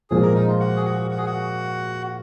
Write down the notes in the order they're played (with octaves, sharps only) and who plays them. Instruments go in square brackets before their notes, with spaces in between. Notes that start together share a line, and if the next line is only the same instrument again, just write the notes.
[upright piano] A#2 F3 G#3 [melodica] G#4
[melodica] A#4
D#4
F4
F#4
G#4
F#4
F#4
G#4
F#4